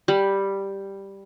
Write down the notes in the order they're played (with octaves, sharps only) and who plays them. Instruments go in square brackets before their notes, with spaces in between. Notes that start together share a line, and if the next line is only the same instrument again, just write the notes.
[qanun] G3